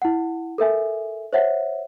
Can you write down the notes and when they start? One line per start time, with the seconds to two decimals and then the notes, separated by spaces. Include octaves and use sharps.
0.02 E4 F#5
0.58 A4 A#4 E5 G#5
1.33 C5 C#5 E5 F#5